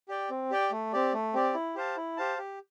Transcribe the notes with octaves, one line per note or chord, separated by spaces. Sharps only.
G4 D5 G5
C4
G4 D5 G5
A3
C4 G4 D5
A3
C4 G4 D5
E4
G4 C5 F5 A5
E4
G4 C5 F5 A5
G4